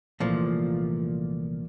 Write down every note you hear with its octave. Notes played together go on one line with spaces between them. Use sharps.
C2 A#2 E3 F3 A3